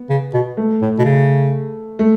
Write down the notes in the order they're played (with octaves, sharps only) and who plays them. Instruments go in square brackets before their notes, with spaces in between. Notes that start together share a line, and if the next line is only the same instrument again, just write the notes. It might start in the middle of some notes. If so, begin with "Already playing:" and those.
Already playing: [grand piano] B3
[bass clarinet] C#3
B2
[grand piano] A3
[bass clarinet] A2
B2
C#3
[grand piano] A3